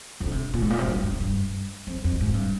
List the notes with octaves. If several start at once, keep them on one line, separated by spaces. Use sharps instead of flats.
F2
D3
C3
A#2
G#2
A#2
C3
G2
G2
G2
F2
F2
G#2
G2